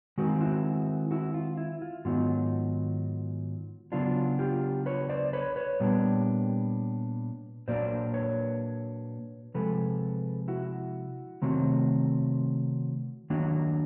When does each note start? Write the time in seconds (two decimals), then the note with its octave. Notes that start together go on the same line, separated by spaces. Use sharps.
0.18 D#3 G#3 C4 F#4
0.30 F4
0.41 E4 F#4
1.11 E4 F#4
1.34 F4
1.57 E4
1.82 F4
2.05 G#2 D#3 F#3 B3 D#4 F4
3.92 C#3 F#3 B3 D4 F4
4.39 F4 G4
4.86 B4 C#5
5.10 C5 D5
5.33 B4 C#5
5.56 B4 C#5
5.80 A#2 G3 B3 D4
7.68 A#2 F#3 A#3 D4 C5 D5
8.14 B4 C#5
9.54 C3 F3 G#3 A4 B4
10.48 E4 F#4
11.42 C3 D#3 F#3 A3 C4
13.30 D#3 F#3 A#3 D4